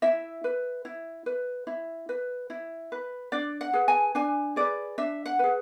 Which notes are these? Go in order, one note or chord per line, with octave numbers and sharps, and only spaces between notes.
E4 E5
B4
E4
B4
E4
B4
E4
B4
D4 D5
F#5
G#4 B4
G#5
D4 G#5
G#4 B4 D5
D4 E5
F#5
G#4 B4